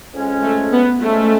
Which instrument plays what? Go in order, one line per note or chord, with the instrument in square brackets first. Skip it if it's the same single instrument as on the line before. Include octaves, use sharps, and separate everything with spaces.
[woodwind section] F2 C#3 G#3 C#4
[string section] A3
B3
[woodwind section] F2 C#3 G#3 C#4 [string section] A3